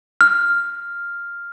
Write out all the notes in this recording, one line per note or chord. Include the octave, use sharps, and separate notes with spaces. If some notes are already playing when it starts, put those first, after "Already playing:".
F6